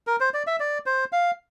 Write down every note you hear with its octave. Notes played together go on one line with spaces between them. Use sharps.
A#4
C5
D5
E5
D5
C5
F5